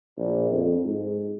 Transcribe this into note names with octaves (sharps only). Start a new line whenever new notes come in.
A#1
F2
G#2